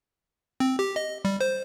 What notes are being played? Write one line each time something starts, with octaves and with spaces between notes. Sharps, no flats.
C4
G4
D#5
G3
C5